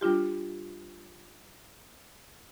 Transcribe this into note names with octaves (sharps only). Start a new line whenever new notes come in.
G3 D4 F4 G4